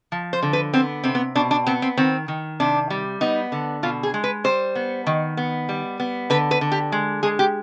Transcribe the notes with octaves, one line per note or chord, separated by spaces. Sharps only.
F3
C5
D3
B4
B3 C4
C3 C4
B3
B2 D4
D4
B3 C4
C4
D#3 C4
D#3
C3 D4
G3
B3 D#4
D3
B2 F4
G#4
G#3
B4
G3 C5
B3
D#3
B3
G3
B3
D3 B4
B4
D3
G4
G#3
G#3 G#4
G4